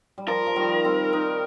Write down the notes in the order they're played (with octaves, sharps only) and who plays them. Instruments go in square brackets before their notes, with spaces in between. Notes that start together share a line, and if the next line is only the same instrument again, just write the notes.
[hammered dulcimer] G3
[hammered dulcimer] F3 [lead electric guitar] A#4
[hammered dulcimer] F3
D#3 G3
G3 C4
D#4